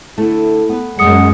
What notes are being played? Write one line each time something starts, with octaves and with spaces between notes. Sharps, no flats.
D3 A3 E4
B3 B4
F#2 G#3 F#5 D#6 C#7